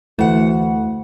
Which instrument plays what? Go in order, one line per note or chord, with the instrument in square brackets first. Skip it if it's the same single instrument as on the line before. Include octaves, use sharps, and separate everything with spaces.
[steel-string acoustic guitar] D2 F#5 [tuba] E3 [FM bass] A3